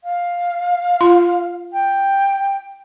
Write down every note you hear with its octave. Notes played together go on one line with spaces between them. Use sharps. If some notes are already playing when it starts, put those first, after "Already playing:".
F5
F4
G5